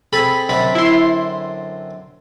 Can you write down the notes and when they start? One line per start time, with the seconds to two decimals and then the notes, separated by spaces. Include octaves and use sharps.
0.13 C4 G#4 A4 B5
0.49 F#2 D3 C4 B5
0.75 E4 C6